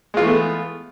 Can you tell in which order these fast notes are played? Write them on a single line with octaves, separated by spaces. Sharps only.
G#3 F4 E3 A3 B3